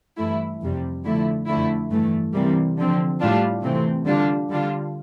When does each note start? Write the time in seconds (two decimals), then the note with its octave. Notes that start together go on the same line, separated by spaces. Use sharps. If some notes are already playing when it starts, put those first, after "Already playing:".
0.17 G2 E3 A3 E4
0.60 F2 C3 G3
1.04 D3 F3 A3 E4
1.47 F2 D3 A3 E4
1.91 G2 E3 A3
2.33 C3 E3 G3 A#3
2.77 D3 F3 C4
3.20 A2 G3 D4 F4
3.62 C3 E3 A3 C4
4.06 D3 G3 D4 F4
4.49 D3 G3 D4 F4